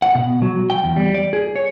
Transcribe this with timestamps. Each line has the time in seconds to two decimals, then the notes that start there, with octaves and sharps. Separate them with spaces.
0.02 F#5
0.15 B2
0.42 F#3
0.70 G5
0.84 E2
0.96 G3
1.14 D5
1.33 G#4
1.56 C#5